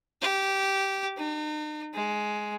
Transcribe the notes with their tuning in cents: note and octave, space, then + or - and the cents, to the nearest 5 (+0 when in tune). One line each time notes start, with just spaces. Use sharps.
G4 -10
D#4 -40
G#3 +10